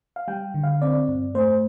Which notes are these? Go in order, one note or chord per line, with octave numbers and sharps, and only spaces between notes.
F5
G3 G5
D3
F5
C4 D5
G2
A3 C5